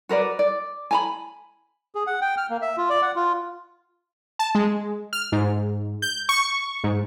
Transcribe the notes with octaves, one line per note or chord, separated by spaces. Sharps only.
F#4 A#4 B4 D5
D5
G#5 A#5 B5
G#4
F#5
G5
F6
A#3
E5
F4
D5
F#5
F4
A5
G#3
F6
G#2
G6
C#6
G#2